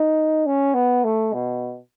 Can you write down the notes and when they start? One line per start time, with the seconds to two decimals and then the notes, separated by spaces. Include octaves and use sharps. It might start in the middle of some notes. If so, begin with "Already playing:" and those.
Already playing: D#4
0.46 C#4
0.74 B3
1.04 A3
1.33 B2